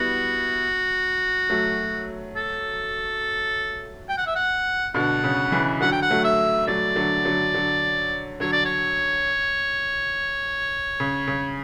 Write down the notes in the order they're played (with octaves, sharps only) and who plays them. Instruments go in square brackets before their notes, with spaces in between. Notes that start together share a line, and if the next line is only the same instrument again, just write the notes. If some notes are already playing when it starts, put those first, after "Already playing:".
Already playing: [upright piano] G3 B3 E4 [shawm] F#4
[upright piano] F#3 A3
[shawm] A4
G5
F#5
E5
F#5
[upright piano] B2 D3 [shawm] F#5
[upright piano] C#3
C#3 E3
[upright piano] D3 F#3 [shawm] F#5
[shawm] G5
F#5
[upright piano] F#3 A3
[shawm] E5
[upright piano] F#3 A3 [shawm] D5
[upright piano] D3 F#3
D3 F#3
D3 F#3
[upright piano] D3 F#3 [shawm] C#5
[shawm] D5
C#5
[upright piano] C#3
C#3